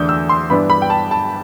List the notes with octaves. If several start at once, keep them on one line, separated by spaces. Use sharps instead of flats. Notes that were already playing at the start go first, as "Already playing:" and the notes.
Already playing: E2 D3 A3 D4 G6
E6
C6
G2 E3 B3 D4 B5
B5
G5
A5
A5